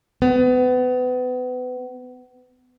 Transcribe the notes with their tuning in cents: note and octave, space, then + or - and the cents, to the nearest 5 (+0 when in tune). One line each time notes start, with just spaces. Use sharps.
B3 +30